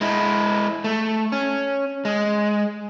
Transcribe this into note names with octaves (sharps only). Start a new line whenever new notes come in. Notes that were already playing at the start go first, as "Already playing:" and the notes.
G#3 E4
A3
C#4
G#3